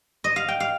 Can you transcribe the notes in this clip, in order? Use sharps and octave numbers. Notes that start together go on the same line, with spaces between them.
D#5
F5
G5
F5